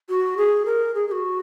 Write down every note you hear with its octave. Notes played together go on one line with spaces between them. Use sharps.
F#4
G#4
A#4
G#4
G#4
F#4